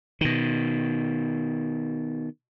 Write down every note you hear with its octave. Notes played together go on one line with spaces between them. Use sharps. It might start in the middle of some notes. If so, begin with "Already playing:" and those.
B2 D#3